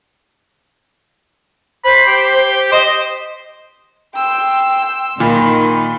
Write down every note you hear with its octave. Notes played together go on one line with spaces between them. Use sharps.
C5 B5
G4
C5 D#5
G5 C6 E6
A#2 D#3 B5 C6